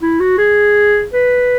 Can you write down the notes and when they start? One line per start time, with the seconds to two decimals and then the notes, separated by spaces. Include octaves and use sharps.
0.02 E4
0.20 F#4
0.38 G#4
1.13 B4